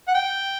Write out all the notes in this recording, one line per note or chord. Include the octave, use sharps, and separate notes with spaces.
F#5
G5